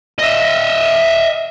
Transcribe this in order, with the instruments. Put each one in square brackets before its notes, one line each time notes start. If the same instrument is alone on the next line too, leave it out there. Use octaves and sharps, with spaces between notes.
[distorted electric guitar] D#5 E5